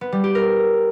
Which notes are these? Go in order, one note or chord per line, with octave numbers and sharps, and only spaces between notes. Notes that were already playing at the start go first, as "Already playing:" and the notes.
B3
G3
G4
A#4